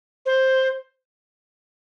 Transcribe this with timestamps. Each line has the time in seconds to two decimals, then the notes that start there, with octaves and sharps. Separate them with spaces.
0.26 C5